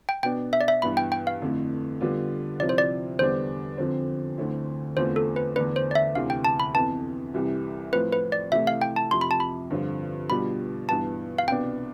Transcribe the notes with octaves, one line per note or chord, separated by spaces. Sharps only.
G5
B2 B3 D4 G5
E5
D5
E5
G2 E3 B3 B5
G5
G5
F5
F2 D3 A3 E4
D3 G3 B3 D4 F4
C3 F3 C4 E4 D5
C5
D5
E2 D3 G3 B3 D4 C5
F2 D3 F3 C4
D2 D3 A3 C4 E4
E2 D3 A3 C4 F4 C5
A4
B4
E2 D3 A3 D4 B4
C5
D5
E5
D2 C3 E3 F5
G5
A5
B5
F2 E3 B3 A5
C2 C3 E3 G3
A2 F3 C4 F4 B4
B4
D5
C3 E3 A3 E4 E5
F5
G5
A5
F2 C3 F3 C6
B5
A5
B5
G2 D3 F3 C4 F4
B2 G3 D4 F4 B5
G2 E3 B3 A5
F5
C2 B2 B3 D4 G5